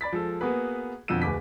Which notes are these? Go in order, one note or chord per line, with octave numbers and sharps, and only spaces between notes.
D5 B5 A6 B6
F3 G#3 A4
A#3 B3 F#4 G#4 B4
F2 B2 D3 F3 E6 D#7
D1 B4 G#5 D6 B6